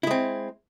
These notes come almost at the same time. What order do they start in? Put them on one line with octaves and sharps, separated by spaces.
E4 G#3 C4